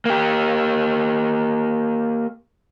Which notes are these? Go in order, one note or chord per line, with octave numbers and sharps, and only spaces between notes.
A#3 G4